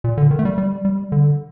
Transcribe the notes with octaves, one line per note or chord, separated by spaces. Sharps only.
A#2
D3
D#3
A3
G3
G3
G3
D3